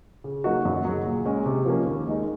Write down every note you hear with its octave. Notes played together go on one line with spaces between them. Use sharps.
C#3
F#3 A#3 D#4 F#4
F#2
C#3 F#3
A#2
G#3 C#4
C3
F3 A#3 C#4
D#2
D#3 G#3 D#4